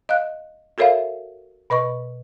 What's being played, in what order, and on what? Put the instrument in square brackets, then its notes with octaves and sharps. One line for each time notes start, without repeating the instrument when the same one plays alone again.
[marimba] D#5 F5 F#6
F#4 A4 A#4 C#5 E5 F5
B2 B4 D#5 C#6